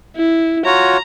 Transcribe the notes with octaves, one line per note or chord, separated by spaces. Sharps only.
E4
F4 F#4 C#5 A#5